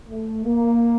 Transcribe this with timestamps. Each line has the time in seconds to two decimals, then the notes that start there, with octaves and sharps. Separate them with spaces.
0.08 A3
0.45 A#3